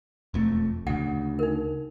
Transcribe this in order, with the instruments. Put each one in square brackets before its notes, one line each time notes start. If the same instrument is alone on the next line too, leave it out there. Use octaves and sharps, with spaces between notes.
[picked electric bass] E1 F2 A3
[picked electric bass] D2 C#3 [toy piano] F#5
[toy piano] D#4 A#4